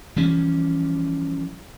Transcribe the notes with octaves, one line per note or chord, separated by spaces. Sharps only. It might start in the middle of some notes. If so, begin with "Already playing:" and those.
E3 F3 G3 C#4